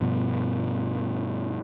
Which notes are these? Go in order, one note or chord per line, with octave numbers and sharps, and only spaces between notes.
G2 B2 F3